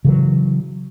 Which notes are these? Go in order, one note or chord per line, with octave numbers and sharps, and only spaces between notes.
C#3 E3 F#3